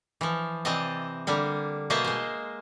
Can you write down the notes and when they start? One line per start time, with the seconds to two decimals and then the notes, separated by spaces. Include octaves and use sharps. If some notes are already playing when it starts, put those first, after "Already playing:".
0.21 E3 F3
0.65 C3 E3 C4 D5 D#5 A5
1.27 D3 G3 A#3
1.90 B2 A#3 C5 D#5 E5 A5
2.04 G#3 C5